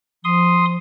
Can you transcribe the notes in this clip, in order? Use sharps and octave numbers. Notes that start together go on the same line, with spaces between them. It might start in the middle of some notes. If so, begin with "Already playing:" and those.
F3 C6 D#6